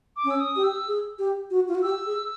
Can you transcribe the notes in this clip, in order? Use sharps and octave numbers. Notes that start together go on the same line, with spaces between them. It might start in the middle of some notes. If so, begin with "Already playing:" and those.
D6
C#4
E6
D#6
G4
E6
G#4
G4
F#4
F4
F#4
G4 E6
G#4